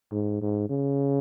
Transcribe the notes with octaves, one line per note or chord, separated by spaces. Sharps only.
G#2
G#2
C#3